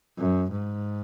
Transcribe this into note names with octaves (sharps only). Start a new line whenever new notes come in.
F#2
G#2